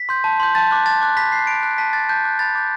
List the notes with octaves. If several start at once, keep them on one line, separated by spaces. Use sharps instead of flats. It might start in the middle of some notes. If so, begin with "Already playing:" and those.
Already playing: B6
C6 G6
A5
C6 G6
A5 A6
D6 F#6
A5 A6
D6 F#6
B5 B6
F#6 C7
B5 D7
F#6
A5 B6
D6 F#6 A6
A5 G6
D6 F#6
B5 A6
D6 G6